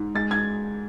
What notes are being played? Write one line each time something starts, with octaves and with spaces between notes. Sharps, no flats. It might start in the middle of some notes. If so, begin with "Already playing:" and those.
Already playing: G#2
G#3 A6
G#6